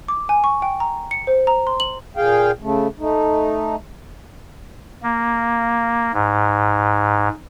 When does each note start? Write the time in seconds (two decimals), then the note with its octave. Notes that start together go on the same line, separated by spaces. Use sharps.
0.08 D6
0.29 G#5
0.44 C#6
0.62 G5
0.80 A#5
1.11 C#7
1.27 C5
1.47 A#5
1.67 C6
1.80 F#7
2.17 A#2 G#4 F5 G5
2.62 C#3 A3
3.00 A3 D#4
5.03 A#3
6.14 G#2